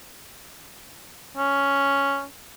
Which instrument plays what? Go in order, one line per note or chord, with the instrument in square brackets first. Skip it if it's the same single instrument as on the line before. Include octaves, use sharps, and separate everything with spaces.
[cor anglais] C#4